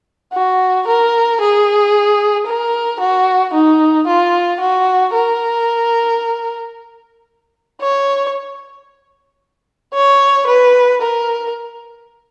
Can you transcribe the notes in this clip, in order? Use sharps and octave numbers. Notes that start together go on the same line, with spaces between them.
F#4
A#4
G#4
A#4
F#4
D#4
F4
F#4
A#4
C#5
C#5
B4
A#4